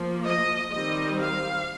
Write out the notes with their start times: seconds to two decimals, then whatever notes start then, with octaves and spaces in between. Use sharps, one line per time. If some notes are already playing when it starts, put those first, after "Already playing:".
Already playing: F3 A#3
0.26 D#5
0.73 D#3 G3 C4 D#5
1.20 F5